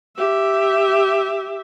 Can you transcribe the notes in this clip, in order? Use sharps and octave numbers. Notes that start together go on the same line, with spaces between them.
G4 E5